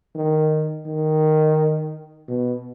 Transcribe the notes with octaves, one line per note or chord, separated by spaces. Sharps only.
D#3
D#3
B2